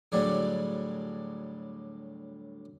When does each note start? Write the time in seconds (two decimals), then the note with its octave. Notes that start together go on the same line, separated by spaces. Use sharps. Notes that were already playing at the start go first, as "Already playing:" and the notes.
0.12 D2 A2 F#3 G3 D4 G#4